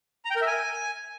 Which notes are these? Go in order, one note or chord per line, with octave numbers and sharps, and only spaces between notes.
A#5
G5
A#4
E5
G#5